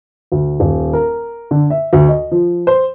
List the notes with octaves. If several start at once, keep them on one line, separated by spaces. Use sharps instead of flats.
D2
D#1
A#4
D3
E5
D2
D#5
F3
C5